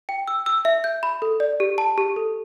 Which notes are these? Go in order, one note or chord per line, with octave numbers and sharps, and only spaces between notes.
G5
E6
E6
E5
G6
B5
A4
D5
G4
A5
G4
A4